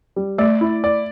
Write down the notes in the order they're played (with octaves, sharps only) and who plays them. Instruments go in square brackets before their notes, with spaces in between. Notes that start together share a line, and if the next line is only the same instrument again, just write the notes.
[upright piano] G3
[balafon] A3 [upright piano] D5
[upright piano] E4
D5